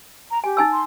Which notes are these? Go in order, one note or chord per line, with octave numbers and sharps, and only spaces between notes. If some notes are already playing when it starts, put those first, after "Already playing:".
A#5
G4 G#5
D#4 G#5 E6
C6